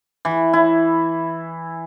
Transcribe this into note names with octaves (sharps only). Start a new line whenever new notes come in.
E3
E4